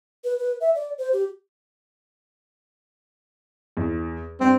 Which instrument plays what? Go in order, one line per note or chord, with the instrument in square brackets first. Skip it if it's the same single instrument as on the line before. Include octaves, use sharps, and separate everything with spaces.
[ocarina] B4
B4
E5
D5
C5
G4
[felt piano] E2
[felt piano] G2 [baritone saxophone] C4